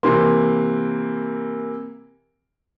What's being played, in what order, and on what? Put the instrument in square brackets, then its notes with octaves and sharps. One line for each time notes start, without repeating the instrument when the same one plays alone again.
[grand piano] C3 E3 A#3 C6